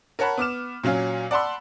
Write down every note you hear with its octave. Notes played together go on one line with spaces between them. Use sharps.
A#4 C#5 F#5 A5 B5
B3 D6 F6 E7
A#2 F#3 C#4 F5
D5 F#5 A5 B5 C6 E6